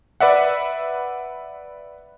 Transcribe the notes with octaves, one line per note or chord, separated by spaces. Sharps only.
B4 D5 E5 F#5